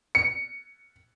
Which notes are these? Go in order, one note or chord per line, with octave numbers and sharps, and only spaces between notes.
C#7